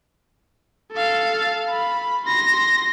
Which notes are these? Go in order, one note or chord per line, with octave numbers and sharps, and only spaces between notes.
A4 F5
B5
C6 A#6